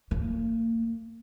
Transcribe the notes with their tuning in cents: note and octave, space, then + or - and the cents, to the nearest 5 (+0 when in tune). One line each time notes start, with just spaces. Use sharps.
A#3 -35